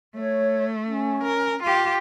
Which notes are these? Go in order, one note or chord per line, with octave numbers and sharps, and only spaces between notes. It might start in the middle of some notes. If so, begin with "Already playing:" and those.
A3 C#5
C#4
A#4
F4 G4